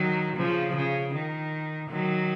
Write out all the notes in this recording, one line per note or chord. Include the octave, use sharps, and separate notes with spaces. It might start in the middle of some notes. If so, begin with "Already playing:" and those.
Already playing: D#3 F#3
C#3 F3
C#3
D#3
D#3 F#3